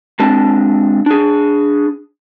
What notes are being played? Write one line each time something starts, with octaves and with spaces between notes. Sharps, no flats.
G#3 C4 D4 A5
D4 G#4